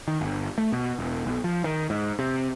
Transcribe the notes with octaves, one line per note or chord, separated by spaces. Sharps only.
D#3
G1
A3
B2
E1
B1
F3
D#3
G#2
C3